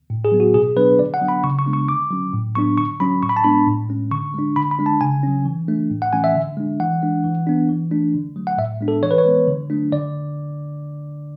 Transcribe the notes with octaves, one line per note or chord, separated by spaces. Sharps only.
A2
G#4
F#3 B3
F#4
B2 G#4
F#3 B3 D4 B4
D3 D5
F#5
F#3 B3 D4
B5
C#3 C#6
C#6
G#3 B3 D4
C#6
D3 D6
F#3 C#4
A2
F#3 B3 D4 C#6
D3 C#6
F#3 C#4 B5
A2 C#6
B5
A5
G#3 B3 D4 B5
A2
G#3 C#4
D3 C#6
G#3 D4
D3 B5
B5
G#3 D4
A5
C#3 G#5
F#3 C#4
E3
A3 D4
A2
F#5
E3 A3 C#4 G#5
E5
D3
G#3 D4
E3 F#5
G#3 D4
E3
B3 D4
E3
A3 D4
D3
F#3 A3
F#5
A2 E5
G#3 B3 D4
A4
E3 C#5
B4
C#5
G#3 B3
D3
F#3 A3 D4
D3 D5